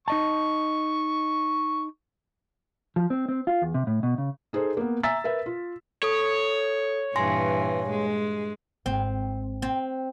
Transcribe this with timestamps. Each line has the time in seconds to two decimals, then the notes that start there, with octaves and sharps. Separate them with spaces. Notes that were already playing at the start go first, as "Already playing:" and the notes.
0.08 D#4 D#5 A5 C#6
2.96 F3
3.10 C4
3.29 C4
3.47 F4
3.62 E2
3.74 C3
3.87 A2
4.03 B2
4.18 C#3
4.53 D#4 G#4 A4 C5
4.77 A#3 B3
5.03 E5 G#5 A#5 E6 A6 B6
5.24 A#4 B4 E5
5.46 F4
6.03 A4 C#5 D#6
7.16 G2 A#2 E3 G#5 C6 A#6
7.90 G#3
8.86 G#1 C4
9.62 C4